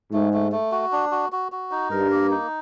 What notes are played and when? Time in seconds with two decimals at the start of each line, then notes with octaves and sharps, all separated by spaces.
0.12 G#2 A3
0.33 A3
0.52 A3
0.72 F#4
0.92 D4
1.11 F#4
1.32 F#4
1.52 F#4
1.71 D#4
1.91 G2 A#4
2.11 A#3
2.31 D#4